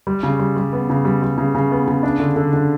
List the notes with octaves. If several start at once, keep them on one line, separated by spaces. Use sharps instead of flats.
G3
C#3
G3
G3
B3
C#3
G3
G3
C#3
C#3
B3
C#3
D4
D3
D3
D3